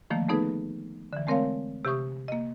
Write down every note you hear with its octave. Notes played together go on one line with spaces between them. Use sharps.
D3 D#3 F3 A3 A#3
A3 B3 D#4 G#4 A4 B4
D3 E3
G#3 A3 C4 A#4 C#5 F5
C3 G4 E5 C#6 D#6
A#3 D#5